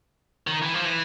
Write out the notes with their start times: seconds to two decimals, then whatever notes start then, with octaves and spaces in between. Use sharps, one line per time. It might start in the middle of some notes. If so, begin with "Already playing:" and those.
0.47 D#3
0.62 E3
0.74 F3
0.85 E3